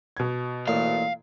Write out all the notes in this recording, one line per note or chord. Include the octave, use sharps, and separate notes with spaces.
B2 G#6
A1 A#2 F5